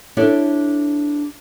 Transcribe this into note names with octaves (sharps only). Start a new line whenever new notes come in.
D4 E4 G4 A4 C#5